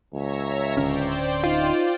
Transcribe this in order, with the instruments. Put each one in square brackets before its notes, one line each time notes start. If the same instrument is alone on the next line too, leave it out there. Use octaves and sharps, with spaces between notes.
[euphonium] C#2 [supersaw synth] C#5 E5 A#5
[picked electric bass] D1 D3 C#4 [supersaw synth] C5 D5 G5
[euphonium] D#4 [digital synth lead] F4